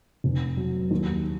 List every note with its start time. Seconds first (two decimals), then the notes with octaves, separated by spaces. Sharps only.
0.24 F1
0.57 F#3
0.91 D#2